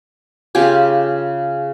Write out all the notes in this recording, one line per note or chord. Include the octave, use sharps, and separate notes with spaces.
C#3 F4 G4 G#5